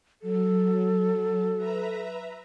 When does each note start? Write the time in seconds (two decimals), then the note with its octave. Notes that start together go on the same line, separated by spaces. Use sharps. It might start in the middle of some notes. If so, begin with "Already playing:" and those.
0.22 F#3 A4
1.56 B4 E5 A#5